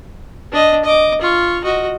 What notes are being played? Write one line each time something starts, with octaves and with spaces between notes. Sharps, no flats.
D4 D#5
D#5 D6
F4 C#6
F#4 D#5